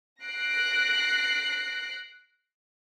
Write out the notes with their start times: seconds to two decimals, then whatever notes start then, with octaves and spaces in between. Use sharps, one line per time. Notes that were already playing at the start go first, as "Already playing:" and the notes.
0.24 F#6 A#6 C7 D7